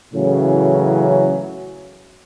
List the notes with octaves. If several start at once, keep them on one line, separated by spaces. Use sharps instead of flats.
A2 C#3 E3 F#3 C#4